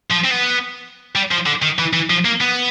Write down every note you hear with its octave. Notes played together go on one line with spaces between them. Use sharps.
F3
C4
B3
G3
F3
D3
D#3
E3
E3
F3
A#3
B3